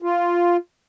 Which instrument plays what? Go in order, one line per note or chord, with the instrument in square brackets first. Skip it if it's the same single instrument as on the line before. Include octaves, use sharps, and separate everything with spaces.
[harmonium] F4